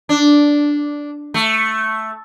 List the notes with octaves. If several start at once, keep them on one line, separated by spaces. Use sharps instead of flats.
D4
A3